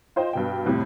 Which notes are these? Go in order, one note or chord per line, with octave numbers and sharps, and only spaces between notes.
F4 C5 D#5 G5
G2 B2 G5
F2 A2 C3 G3